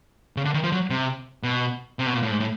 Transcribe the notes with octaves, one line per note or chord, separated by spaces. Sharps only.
C#3
D3
D#3
F3
F#3
C3
B2
C3
B2
A#2
A2
G#2
A2